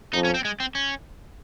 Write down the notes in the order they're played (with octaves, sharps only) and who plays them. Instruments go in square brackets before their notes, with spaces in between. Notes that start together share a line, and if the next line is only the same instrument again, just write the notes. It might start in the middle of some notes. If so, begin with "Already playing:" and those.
[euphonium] F2 [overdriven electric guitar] D#4
[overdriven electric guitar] C#4
C4
G#3
C4
C#4